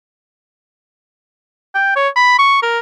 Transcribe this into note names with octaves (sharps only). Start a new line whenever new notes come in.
G5
C#5
B5
C#6
A#4